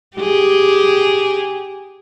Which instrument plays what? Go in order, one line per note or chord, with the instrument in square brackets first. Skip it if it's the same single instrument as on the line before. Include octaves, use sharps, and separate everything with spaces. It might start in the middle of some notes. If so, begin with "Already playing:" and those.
[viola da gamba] G4 G#4